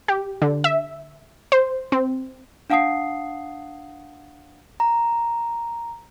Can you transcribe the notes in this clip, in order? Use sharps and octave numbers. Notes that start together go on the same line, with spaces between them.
G4
D3
E5
C5
C4
D4 F5 F#5 A5 D#6 C7
A#5